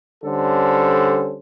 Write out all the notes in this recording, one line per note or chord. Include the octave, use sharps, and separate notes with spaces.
D3 G3 C#4 A4 C5